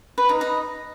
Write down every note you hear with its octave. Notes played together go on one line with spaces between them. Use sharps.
B4
D#4
D#5